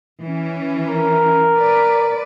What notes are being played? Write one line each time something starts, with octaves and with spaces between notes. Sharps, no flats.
E3 C#4
A#4
B4 D5